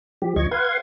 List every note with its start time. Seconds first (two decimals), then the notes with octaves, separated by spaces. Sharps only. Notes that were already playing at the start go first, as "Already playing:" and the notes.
0.22 F3 G4
0.36 D2 F3 D#5 C#6 G#6
0.51 B4 F5 F#5 C6 G#6